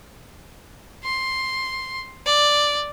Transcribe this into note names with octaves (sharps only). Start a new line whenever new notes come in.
C6
D5